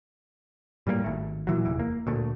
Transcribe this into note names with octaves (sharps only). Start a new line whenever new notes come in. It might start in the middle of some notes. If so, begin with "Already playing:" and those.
A2 G3 G#3 A#3
G#1 A3
A#2 E3 F#3
F1 E2 E3
A#3
D2 A#2 A3